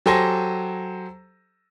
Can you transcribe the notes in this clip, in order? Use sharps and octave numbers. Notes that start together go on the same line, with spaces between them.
F#3 G4 A4 C5 G#5 A#6